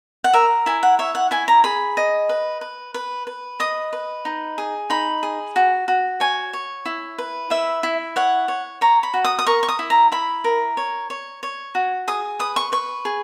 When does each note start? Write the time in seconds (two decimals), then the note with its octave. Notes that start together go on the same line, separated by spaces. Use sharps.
0.24 F#5
0.33 A#4 E5
0.66 E4 G#5
0.83 F#5
0.99 C#5 E5
1.15 F#5
1.31 E4 G#5
1.48 A#5
1.64 G#4 B5
1.97 D#5
2.29 B4
2.61 B4
2.94 B4
3.27 B4
3.60 D#5 D#6
3.93 B4
4.25 D#4
4.58 G#4
4.90 D#4 B5
5.23 G#4
5.56 F#4
5.88 F#4
6.20 C#5 G#5
6.53 C#5
6.86 E4
7.18 B4
7.50 E4 E5
7.83 E4
8.16 C#5 F#5
8.48 C#5
8.81 C#5 A#5
9.03 B5
9.14 F#4
9.25 D#6
9.39 D#6
9.47 A#4 C#6
9.63 C#6
9.69 D#6
9.79 E4
9.90 A#5
10.12 E4 B5
10.44 A#4
10.77 C#5
11.10 C#5
11.43 C#5
11.75 F#4
12.08 G#4 D#6
12.39 B4 D#6
12.56 C#6
12.72 B4 C#6
13.05 G#4